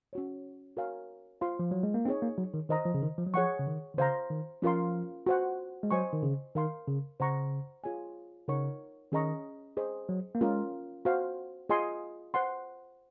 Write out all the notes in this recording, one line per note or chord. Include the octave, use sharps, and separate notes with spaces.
C#4 F#4 C#5
F#4 A#4 C#5 F5 G#5
F4 C5 F5 C6
F3
F#3
G#3
A#3
C4 D#4 G#4 C#5
A#3
F#3
D#3
D#3 C5 D#5 A#5
F3
C#3
D#3
F3
F#3
F3 G#4 C#5 F#5 C#6
C#3
D#3
D#3
C#3 C5 F5 A#5
D#3
F3 C#4 F4 A#4 F5 C6
F#4 C5 F#5
G#3
F#3 C5 D#5 G#5 C#6
D#3
C#3
D#3 A#4 F5 C6
C#3
C#3 C5 F#5 A#5 C#6
F4 G#4 C#5 G#5
C#3 D#4 A#4 C#5 F#5 C#6
D#3 C#4 G#4 D#5 A#5 C#6
G#4 C5 D#5
F#3
A#3
G#3 C#4 F4 A#4
F#4 C5 F5
F4 G#4 D#5 G#5 C6
C5 F#5 C6